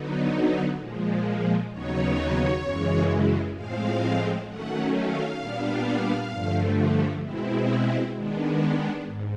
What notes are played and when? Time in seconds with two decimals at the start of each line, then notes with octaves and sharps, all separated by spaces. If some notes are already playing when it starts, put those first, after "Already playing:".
Already playing: D3 F#3 B3 D#4
0.78 A#2 F3 G#3
1.71 D#2 C#3 F#3 B3 D#4 C#5
2.62 F#2 C#3 E3 G#3
3.54 A2 F3 G#3 C4 F5
4.47 D#3 F#3 A3 C#4 F#5
4.93 F5
5.38 A#2 G3 B3 D4
6.30 G2 D3 F3 A3
7.22 B2 G#3 C4 E4
8.15 D#3 G#3 B3 D4
9.06 G#2